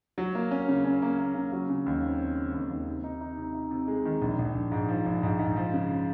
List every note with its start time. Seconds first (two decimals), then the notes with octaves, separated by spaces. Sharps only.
0.18 F#3
0.35 A#3
0.51 C#4
0.68 C#3
0.84 C#4
1.02 A#3
1.19 A#3
1.35 C#3
1.52 F#3
1.69 C#3
1.86 D#2
2.03 C4
2.19 C4
2.36 C#3
2.54 D#2
2.70 D#2
2.87 C3
3.04 D#4
3.21 D#4
3.38 C3
3.55 D#4
3.71 C3
3.88 G#3
4.05 D#3
4.22 A#1
4.39 A#1
4.55 A#1
4.72 G#2
4.89 F3
5.06 A#1
5.23 G#2
5.39 G#2
5.56 F3
5.74 C#3